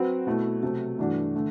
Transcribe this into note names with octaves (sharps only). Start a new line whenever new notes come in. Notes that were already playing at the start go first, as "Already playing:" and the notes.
Already playing: F#3 C4 F#4 B4
B2 A3 E4
C3 F#3 A3
G2 E3 A3 D4 F#4
D3 A3